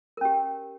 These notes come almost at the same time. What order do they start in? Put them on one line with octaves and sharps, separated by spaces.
A#4 C#4 G4